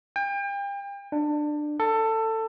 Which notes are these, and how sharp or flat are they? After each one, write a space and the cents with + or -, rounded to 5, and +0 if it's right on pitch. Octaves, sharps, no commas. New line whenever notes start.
G5 +35
D4 +20
A4 +20